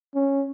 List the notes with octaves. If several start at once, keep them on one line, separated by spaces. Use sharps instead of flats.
C#4